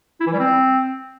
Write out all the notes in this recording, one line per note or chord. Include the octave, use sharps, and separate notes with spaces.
E4
E3
G3
C4